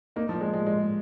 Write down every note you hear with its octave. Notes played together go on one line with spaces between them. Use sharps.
A#3 D#4
F3
G#3
G#3
G#3